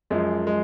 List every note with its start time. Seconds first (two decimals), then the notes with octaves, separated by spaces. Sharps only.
0.10 F#2 F3 G#3
0.47 G#3